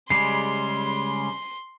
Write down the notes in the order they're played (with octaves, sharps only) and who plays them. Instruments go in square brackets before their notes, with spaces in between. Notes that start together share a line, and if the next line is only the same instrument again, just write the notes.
[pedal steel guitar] C#3 G3 G#3 [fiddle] C6 [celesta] C7